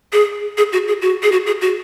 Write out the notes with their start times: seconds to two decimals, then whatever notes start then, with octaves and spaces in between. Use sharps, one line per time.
0.13 G#4
0.58 G#4
0.73 F#4
0.88 G#4
1.02 F#4
1.23 G#4
1.32 F#4
1.46 G#4
1.61 F#4